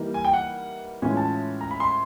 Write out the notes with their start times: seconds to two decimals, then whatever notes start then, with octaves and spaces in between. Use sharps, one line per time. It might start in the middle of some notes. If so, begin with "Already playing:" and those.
Already playing: E3 G3 A#3 D#4
0.14 G#5
0.25 G5
0.33 F#5
1.02 A2 E3 G#3 C#4 F4 G#5
1.17 A5
1.61 A#5
1.71 B5
1.80 C6